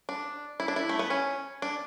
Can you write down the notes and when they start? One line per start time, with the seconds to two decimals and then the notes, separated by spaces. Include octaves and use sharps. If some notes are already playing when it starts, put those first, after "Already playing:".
0.09 D4
0.60 E4
0.68 D4
0.76 E4
0.89 A3
0.99 B3
1.10 C#4
1.62 D4